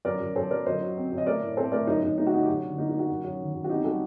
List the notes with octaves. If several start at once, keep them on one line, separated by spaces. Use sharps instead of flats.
F#2 A#4 D5
F#2
F#2 A4 C5
F#3 A#4 D5
F#2 C5 D#5
F#3
C4
F#2
D#5
A3 A#4 D5
A2
C4 A4 C5
A3 A#4 D5
F#2 D#4
F#2 D#4
A3 D#4
F#4
F#3 D#4
G4
F#2 F#4
D3
A#3 D#4
D#4
A#3
F#4
F#2
F#2
D#3
F#2
F#4
C4 D#4 G4
G3 F#4 A4